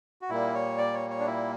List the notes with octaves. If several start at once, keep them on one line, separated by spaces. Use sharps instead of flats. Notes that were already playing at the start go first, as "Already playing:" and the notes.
F#4
A#2 G3 A#3 E4
C#5
D5
C#5
C#5
D4
E4